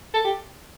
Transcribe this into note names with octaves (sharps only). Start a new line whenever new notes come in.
A4
G4